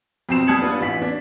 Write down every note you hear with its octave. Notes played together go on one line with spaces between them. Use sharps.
F2 B2 C4 C7 E7
G3 A5 D#6 G#6 C#7 F#7
B3 D4 F4 B4
A1 E3 B6 F#7
D4